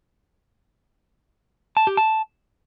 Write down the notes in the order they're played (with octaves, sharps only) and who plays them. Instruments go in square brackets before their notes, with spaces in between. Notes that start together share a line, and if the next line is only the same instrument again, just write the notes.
[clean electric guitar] A5
G4
A5